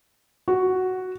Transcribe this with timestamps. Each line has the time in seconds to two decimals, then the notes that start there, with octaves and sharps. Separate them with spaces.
0.48 F#4